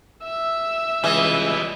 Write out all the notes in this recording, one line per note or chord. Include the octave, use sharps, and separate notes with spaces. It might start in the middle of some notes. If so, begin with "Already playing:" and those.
E5 E6
C#2 E3 G3 D#5